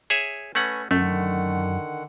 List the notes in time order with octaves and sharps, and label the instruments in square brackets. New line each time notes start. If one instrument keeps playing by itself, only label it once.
[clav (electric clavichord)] G#4 C#5 E5
[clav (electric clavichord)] A3 C#4 F#5 [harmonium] B4 G#5
[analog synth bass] F#2 [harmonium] D3 D#3 F#5 [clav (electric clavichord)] A3